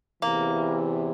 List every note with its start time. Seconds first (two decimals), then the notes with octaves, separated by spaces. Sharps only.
0.22 E2 C3 E3 A#3